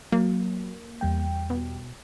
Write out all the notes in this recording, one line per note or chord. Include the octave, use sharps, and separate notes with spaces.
F#3 A#3
E2 G3 G5
B2